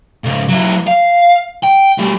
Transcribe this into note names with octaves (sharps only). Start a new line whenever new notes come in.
G#2 C#3
F#3 E4
F5
G5
G3 A3